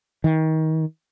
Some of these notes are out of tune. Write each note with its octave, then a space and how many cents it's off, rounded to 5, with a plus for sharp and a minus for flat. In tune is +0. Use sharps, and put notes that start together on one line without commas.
D#3 +30